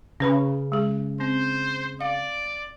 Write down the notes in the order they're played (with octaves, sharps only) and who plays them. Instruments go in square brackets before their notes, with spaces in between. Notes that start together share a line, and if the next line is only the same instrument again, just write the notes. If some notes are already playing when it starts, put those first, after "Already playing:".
[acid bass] C#3 [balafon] C#4 B4 B5
[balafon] G#3 G#4
[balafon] C4 [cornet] C5
[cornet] D5 [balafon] F5